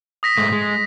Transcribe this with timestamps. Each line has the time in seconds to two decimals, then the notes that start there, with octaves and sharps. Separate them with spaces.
0.23 D#6 A#6 B6
0.38 G#2 G#3 A3
0.52 G#3